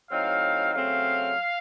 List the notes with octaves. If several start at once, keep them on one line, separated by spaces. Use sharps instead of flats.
A2 F#3 C4 D#4 F5
C#3 F#3 A3 C4 F5